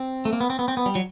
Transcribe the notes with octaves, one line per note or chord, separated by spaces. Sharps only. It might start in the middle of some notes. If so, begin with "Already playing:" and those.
Already playing: C4
A3
A#3
B3
C4
B3
C4
B3
G3
F#3